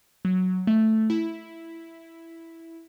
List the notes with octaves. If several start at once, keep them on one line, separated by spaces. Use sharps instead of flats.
F#3
A3
E4